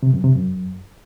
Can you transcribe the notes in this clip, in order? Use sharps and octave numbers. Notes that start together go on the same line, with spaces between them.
C3
F#2
C3
F#2